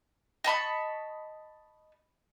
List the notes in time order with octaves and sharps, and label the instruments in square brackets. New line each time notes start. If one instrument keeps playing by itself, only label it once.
[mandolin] D#5 A5 B5 C#6